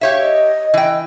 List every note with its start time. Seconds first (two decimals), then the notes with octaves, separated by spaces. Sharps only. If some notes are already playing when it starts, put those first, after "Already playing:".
0.01 G4 C#5 E5 F5
0.21 D#5
0.74 E3 G5